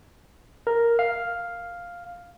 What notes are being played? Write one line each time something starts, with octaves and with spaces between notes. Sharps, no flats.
A#4
F5